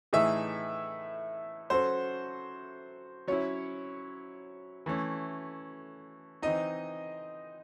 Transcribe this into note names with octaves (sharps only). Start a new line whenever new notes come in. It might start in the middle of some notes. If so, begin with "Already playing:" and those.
A2 E3 A3 D#4 G#4 E5
F#3 C#4 F#4 A4 C5
F#3 C#4 E4 C#5
E3 A3 C#4
E3 C4 D#4 D#5